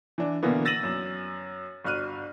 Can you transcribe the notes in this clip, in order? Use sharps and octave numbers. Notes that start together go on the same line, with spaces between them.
E3 D4
B2 D3 E3 A#3 B3
E6 A6 A#6 D#7 E7 F#7
F#2
G1 F#4 F6 F#6 D#7